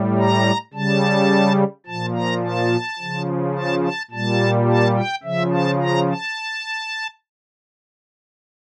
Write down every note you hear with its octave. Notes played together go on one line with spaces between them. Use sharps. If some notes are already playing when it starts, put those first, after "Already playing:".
Already playing: A2 G3
A#5
C#3 G3 A5
A#2 F3 A5
A#5
A5
C#3 F3
A5
A5
A#2 G3 A5
A5
G5
C#3 F3 E5
A5
A#5
A5